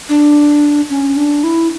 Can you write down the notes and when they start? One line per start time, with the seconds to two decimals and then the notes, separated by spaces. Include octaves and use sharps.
0.09 D4
0.90 C#4
1.17 D4
1.43 E4